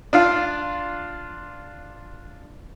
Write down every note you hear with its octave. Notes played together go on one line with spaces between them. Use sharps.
D4 F4 F5